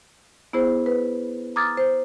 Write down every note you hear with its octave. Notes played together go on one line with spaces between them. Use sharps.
B3 E4 G#4 C5
B4
A#5 D6 D#6 F6 G#6 A6
C5